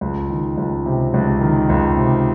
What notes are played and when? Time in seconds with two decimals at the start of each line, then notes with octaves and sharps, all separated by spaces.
0.01 C#2
0.30 D#3
0.58 C#2
0.86 C3
1.14 C#2
1.41 D#3
1.69 C#2
1.97 C3